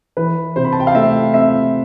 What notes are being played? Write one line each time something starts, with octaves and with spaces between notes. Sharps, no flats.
E3 B4
C3 C5
B5
A5
G5
F5
A3 E5
C4 E5